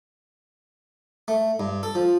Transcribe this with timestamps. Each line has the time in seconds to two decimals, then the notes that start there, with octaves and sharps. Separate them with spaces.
1.28 A3
1.60 G2
1.83 A4
1.95 F3